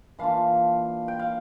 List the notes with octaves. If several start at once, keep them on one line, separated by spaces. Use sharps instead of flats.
E3 A#3 D4 F4 F5 A5
G5
F5